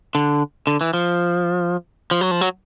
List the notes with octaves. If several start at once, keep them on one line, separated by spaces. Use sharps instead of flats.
D3
D3
E3
F3
F3
F#3
F3
F#3